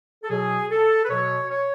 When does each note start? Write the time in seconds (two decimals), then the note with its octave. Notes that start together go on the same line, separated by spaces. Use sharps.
0.23 A4
0.30 B2 F#3 G#4
0.70 A4
1.04 B4
1.10 B2 F#3 C#5
1.51 C#5